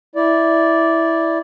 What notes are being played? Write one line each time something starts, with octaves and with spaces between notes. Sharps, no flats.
E4 D5